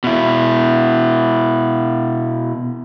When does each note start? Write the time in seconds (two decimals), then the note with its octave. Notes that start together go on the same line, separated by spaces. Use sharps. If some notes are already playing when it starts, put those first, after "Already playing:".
0.04 B2 E4